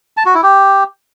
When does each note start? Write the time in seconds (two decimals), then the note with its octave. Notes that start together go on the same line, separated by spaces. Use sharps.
0.17 A5
0.26 F#4
0.34 E4
0.43 G4